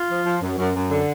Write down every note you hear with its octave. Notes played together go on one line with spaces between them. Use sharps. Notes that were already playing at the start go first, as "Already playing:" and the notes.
Already playing: F4
F3
F3
F#2
F#2
F#2
D3